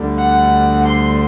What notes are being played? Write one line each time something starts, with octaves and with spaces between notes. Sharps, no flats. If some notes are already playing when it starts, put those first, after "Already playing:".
Already playing: D2 D3 G3
F#5
C6